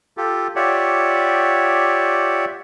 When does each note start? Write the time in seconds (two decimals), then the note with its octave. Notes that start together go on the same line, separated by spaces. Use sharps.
0.17 F4 G4 A4
0.56 F4 G4 C#5 D5 E5 F#5